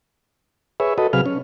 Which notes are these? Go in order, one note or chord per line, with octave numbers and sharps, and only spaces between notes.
G#4 B4 C#5 E5
F#4 A4 B4 D#5
C3 F#3 G#4 B4 F5 F6
C#4